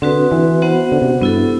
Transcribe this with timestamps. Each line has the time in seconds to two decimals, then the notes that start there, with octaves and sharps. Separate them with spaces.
0.02 D3 C4 F#4 B4
0.32 E3
0.62 B3 F#4 C5 F#5
0.92 D3
1.02 C3
1.21 G2 B3 E4 A4